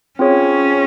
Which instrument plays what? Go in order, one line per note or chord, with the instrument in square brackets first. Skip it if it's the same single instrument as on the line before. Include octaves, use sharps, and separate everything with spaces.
[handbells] C4 F4 G#4 C#5 [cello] C#4